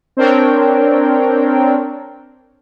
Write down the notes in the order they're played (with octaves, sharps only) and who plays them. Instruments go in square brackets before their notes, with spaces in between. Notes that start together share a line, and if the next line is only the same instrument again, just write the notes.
[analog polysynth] C4 D4 A#4 C#5 G5